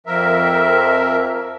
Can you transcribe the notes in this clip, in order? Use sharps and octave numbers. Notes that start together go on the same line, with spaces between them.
F2 F3 A#4 E5